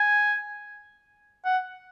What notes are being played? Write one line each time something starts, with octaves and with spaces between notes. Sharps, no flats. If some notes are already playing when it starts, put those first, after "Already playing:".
Already playing: G#5
F#5